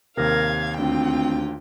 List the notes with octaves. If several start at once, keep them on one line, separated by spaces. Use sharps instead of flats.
D#2 C3 A#4 F5 G#6
D2 C4 F4 G5